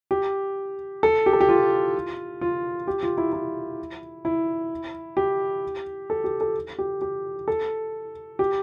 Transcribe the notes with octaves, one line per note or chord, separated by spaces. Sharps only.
G4
A4
G4
A4
G4
F4
F4
G4
F4
E4
E4
E4
G4
A4
G4
A4
G4
G4
A4
G4